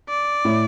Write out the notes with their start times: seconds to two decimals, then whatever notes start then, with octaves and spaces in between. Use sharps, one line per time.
0.09 D5
0.45 A2